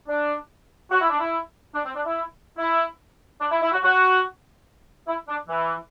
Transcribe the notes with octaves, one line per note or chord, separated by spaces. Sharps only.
D4
F#4
E4
D4
E4
D4
C4
D4
E4
E4
D4
E4
E4
F#4
F#4
E4
D4
E3